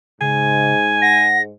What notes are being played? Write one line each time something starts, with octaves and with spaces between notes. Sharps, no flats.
G#2 C#3 G#5
F#5 A#6